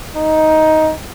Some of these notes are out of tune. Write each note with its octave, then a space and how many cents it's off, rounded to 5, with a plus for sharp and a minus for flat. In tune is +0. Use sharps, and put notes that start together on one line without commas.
D#4 +10